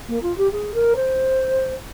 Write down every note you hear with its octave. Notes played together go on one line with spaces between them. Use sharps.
A#3
F4
G4
G#4
A#4
C5